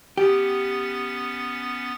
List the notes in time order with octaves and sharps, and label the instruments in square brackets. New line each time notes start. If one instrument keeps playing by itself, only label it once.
[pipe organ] B3 C#4 A6 [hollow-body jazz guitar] G4